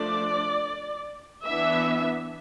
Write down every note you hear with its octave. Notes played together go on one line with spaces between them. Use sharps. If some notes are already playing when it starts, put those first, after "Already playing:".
Already playing: F3 A3 D4 D5
E3 B3 D4 E5